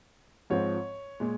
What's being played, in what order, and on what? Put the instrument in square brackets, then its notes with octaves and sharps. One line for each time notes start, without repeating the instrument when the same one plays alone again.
[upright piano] G#2 F3 C4 C#5
A#2 G#3